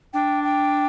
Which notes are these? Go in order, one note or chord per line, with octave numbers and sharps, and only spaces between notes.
D4 G5
G5